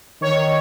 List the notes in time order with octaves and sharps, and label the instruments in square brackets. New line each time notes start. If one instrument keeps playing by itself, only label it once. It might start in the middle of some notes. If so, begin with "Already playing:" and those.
[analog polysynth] D#3 C#5